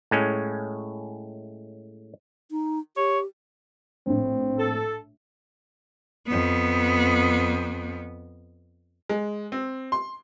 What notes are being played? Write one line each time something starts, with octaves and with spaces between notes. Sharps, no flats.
A2 G#3 C#4
D#4
G4 C#5
A#1 A2 C4
A4
F2 B3
G#3
C4
C6